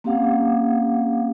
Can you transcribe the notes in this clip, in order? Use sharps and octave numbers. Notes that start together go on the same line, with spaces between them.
A#3 C4 C#4 G4 F5 F#5